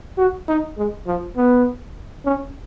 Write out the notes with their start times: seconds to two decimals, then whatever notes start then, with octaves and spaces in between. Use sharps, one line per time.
0.18 F#4
0.48 D#4
0.77 G#3
1.07 F3
1.36 B3
2.25 C#4